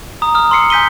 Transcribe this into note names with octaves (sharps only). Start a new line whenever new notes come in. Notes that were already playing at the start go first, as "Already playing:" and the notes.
A#5 D#6
D#6 F6
C6 E6 C7 C#7
G#5 G6 B6 D#7 G7